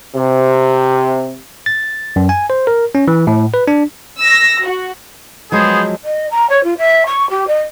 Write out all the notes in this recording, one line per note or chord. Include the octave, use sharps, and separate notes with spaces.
C3
A6
F#2
G#5
C5
A#4
C#4
E3
A2
B4
D4
E6 A#6
F#4
F3 F#3 G#3 B3 G#4 C5
D#5
A#5
C#5
F4
E5
C#6
G4
D#5